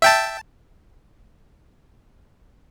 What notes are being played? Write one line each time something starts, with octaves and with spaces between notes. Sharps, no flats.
E5 G5 A5